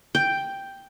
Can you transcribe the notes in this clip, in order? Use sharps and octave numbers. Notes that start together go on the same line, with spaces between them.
G5